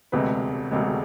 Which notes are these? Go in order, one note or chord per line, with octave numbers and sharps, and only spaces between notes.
E1 D2 C3 G#3 B4
E1 D2 C3 G#3